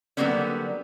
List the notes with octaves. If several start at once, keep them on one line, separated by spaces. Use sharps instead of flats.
D3 F#3 G3 A#3 B3 C#4